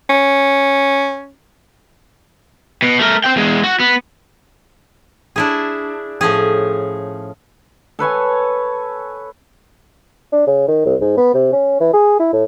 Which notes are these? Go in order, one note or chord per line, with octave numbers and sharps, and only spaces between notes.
C#4
B2
A3 A#4
C5 G5
E2 G#3
F#4
B3
D4 E4 G#4
A2 F3 C#4 G#4
A4 B4 C#5 G#5
D4
C#3
D#3
C2
G#2
B3
C3
C#4
E3
G#4
E4
A2